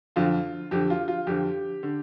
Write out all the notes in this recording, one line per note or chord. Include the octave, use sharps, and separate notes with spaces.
F2 D3 F4
F2 D3 G4
F4
F4
F2 D3 G4
D3